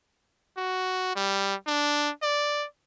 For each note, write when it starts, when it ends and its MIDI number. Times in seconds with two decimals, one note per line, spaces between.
0.57 1.14 66
1.16 1.55 55
1.67 2.10 62
2.22 2.66 74